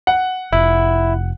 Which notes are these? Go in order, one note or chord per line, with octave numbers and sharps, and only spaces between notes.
F#5
F1 E4